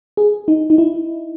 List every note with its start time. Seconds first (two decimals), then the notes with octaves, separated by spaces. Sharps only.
0.17 G#4
0.48 D#4
0.70 D#4
0.78 E4